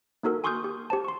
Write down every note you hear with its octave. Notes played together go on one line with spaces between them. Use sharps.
A#3 D#4 F#4 A4 A#4
G#5 C6 C#6 D#6 F6 G6
G4
G4 C5 A5
C6 C#6